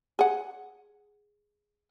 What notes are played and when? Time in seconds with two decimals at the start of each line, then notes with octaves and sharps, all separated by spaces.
0.19 G#4 F#5